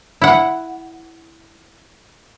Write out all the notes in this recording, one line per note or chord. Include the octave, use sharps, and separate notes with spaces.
E4 F#5